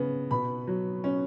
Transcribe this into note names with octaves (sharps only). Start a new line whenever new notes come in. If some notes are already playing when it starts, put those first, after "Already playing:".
Already playing: C#3 B3
B2 B5
F#3
C#4